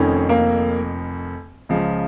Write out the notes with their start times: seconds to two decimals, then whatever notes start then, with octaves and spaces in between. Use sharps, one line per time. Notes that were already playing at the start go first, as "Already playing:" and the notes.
Already playing: F1 F2 D#3 C#4
0.29 A#3
1.69 C#2 C#3 F3